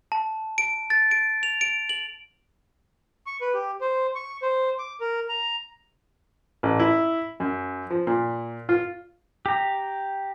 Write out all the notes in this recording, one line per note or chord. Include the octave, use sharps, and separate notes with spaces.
A5
D7
A6
D7
F7
D7
F#7
C#6
B4
G4
C5
C#6
C5
D6
A#4
A#5
A1
E4
F#2
F3
A#2
F4
G4 A#5